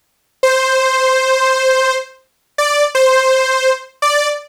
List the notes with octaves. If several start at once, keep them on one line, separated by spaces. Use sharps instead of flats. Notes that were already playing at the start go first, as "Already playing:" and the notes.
C5
D5
C5
D5